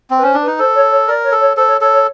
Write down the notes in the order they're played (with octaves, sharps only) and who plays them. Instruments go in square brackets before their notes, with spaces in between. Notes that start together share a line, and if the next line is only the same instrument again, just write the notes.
[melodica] C4
[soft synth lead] B4
[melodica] C#4 [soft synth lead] C5
[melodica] D4
[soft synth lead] B4
[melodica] D#4
[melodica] A4 [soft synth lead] C5
[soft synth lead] C#5
C#5
[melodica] A#4 [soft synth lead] D5
[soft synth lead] C#5
[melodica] A4
[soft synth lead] C#5
[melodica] A4 [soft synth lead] C5
[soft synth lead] C#5
[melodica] A4 [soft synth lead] C#5
[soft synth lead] C#5